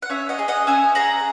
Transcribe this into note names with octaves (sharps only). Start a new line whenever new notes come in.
F#5
C#4 C#5 E5
D#5 F#5
G#4
D#5 F#5
C#4 E5 G#5
G#4 F#5 A#5